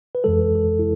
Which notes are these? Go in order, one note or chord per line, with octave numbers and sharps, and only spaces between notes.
B4
F2 E3 G#3 A4
A4
E4